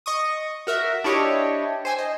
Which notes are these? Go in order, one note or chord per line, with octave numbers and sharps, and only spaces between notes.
D#5 C#6 D#6
F#4 A#4 E5
D4 E4 G4 C#5 D#5
C5 G#5 E6
D#5